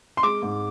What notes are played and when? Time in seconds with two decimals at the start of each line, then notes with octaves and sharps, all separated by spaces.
0.17 C6
0.23 G#3 D6
0.42 G#2